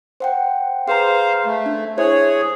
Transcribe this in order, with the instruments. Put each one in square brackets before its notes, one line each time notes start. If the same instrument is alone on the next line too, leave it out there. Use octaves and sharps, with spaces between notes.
[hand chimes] C5 F#5 G5
[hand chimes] G#4 B4 A#5 [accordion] C5 F5
[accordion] A3
[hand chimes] D4
[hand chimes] E4 C5 E5 [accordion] G#4 C#5